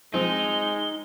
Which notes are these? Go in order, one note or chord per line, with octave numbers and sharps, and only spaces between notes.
F3 G#3 C4 D#4 G7